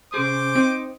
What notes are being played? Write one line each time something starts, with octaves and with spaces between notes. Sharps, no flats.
C3 C#4 G#4 C5 D6
C4 D#4